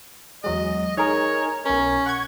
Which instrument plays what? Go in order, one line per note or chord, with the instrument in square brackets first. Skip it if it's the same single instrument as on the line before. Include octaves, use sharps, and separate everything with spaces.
[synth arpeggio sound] E2 F#3 G#3 [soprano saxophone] D#5
[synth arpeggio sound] D#4 G#4 A#4 [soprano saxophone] C#5
[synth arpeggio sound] B1 A#4 [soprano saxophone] C#4
[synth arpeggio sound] F#5 C#6 G#6